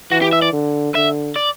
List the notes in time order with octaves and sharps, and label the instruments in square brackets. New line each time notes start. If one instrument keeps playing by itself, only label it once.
[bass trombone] E3 [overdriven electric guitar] F#4
[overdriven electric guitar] G4
E5
D5
[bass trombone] D3
[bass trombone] D3 [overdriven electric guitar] E5
[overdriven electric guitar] D5